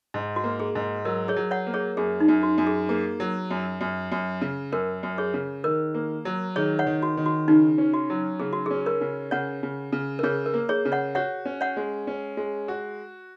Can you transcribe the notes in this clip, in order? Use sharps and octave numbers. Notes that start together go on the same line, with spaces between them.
G#2
F#4
A#3
G#4
G#2
F#3 A#4
G#4 C#5
F#3
C#5 F#5
A#3
G#4 C#5
F#2 G#4
D#4
F#2
F#4
F#2
G#4
A#3 G#4
F#3
F#2
F#2
F#2
C#3
F#2 A#4
F#2
G#4 C#5
C#3
D#3 A#4
A#3
F#3
D#3 G#4 C#5
C#5 F#5
D#3
F#4
D#3
F#4
C#3 D#4
C#4
F#4
F#3
C#3 G#4
F#4
C#4 G#4
A#4
C#3
C#3 C#5 F#5
C#3
C#3
A#4
C#3 G#4 C#5
A#4
A#3
G#4 C#5
C#3
C#5 F#5
F#4 C#5 F#5
C#4
C#5 F#5
G#3
C#4
G#3
F#4